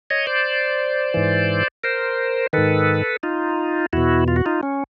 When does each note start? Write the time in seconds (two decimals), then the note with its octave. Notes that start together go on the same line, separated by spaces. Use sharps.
0.10 C#5 D#5
0.27 C5 D5
1.14 G#2 E3
1.84 A#4 C5
2.53 G#2 D#3 A4 B4
3.23 D#4 F4
3.93 E2 B2 E4 F#4
4.28 F4
4.36 F#4
4.46 D#4 F4
4.63 C#4